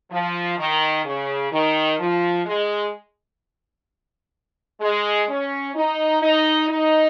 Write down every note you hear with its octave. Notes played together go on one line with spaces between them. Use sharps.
F3
D#3
C#3
D#3
F3
G#3
G#3
C#4
D#4
D#4
D#4